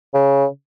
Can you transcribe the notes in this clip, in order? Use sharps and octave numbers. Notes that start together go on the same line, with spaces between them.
C#3